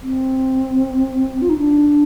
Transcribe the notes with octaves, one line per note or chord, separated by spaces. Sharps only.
C4
F4
D#4
D4